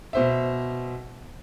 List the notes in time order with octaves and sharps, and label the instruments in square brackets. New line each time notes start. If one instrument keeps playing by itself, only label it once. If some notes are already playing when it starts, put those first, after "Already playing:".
[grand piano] B2 C5 E5